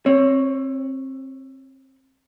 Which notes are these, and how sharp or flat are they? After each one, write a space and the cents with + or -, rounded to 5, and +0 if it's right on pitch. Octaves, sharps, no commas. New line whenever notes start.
C4 +30 C#5 +0